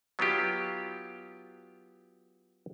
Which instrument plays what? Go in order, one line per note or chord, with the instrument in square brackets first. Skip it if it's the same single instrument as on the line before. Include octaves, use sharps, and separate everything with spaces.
[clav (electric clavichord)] F#3 B3 D#4 F4 G4